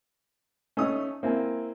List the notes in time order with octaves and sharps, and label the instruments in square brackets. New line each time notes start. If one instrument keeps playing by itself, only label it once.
[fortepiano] A3 D#4 D#6 [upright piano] C#4
[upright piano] A#3 E4 G#5 [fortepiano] C4